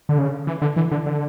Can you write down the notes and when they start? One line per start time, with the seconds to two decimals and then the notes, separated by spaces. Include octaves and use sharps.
0.09 D3
0.18 C#3
0.47 E3
0.62 D3
0.76 E3
0.91 D3
1.06 D3